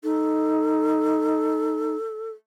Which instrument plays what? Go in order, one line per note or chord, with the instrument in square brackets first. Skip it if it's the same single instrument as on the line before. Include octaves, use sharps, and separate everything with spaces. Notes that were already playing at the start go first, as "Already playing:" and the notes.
[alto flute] D#4 [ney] A4